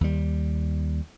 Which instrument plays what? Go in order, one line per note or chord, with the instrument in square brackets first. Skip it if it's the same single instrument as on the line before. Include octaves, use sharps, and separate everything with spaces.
[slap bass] D#2 G3